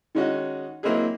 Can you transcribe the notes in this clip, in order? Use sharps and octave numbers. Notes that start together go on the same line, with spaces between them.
D#3 G#3 C#4 D#4 F#4
F#3 A#3 C4 D#4 E4 G#4